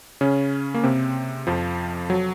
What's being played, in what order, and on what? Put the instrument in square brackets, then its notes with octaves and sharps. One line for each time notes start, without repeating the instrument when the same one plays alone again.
[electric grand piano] C#3 C#4
A#3
C3 C4
F2 F3
F#3